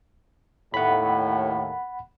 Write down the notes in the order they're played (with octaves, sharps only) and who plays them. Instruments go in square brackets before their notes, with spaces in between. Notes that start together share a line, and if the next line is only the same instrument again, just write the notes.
[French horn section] D#2 A2 [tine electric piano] F#5 B5